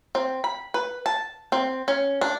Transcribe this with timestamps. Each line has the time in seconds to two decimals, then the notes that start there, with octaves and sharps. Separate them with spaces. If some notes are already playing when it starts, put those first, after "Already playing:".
0.15 C4
0.44 B5
0.74 B4
1.06 A5
1.52 C4
1.88 C#4
2.21 D4